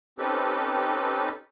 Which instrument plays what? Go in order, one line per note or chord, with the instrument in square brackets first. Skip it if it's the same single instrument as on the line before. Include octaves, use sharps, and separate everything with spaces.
[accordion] C4 C#4 D#4 G4 A4 B4